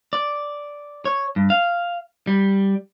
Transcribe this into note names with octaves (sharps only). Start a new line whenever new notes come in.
D5
C#5
G2
F5
G3